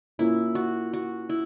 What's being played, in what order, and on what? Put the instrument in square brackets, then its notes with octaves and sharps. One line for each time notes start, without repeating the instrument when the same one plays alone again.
[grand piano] A#2 A#3 C#4 [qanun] E4
[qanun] F#4
F#4
E4